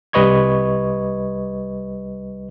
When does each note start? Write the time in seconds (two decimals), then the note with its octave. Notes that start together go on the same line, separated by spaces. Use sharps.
0.13 C2 G3 B4 D#5 C#6 G#6